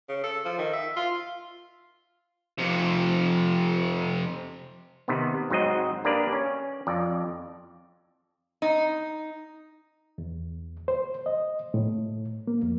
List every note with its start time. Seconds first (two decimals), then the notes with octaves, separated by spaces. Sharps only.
0.09 C#3
0.24 A4
0.45 F3
0.58 D#3
0.73 E5
0.97 F4
2.58 F2 C3
5.08 C3 D#3 B3
5.50 G#2 F#3 C4 D#5
6.05 A#3 D4 G4 B4 D5
6.33 C#4
6.87 F2 D5
8.62 D#4
10.18 E2
10.88 C5
11.26 D#5
11.74 A2
12.47 A#3
12.62 F2